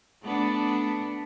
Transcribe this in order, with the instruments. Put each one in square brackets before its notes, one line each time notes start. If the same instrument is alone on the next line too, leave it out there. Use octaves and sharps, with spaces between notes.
[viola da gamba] A3 B3 D4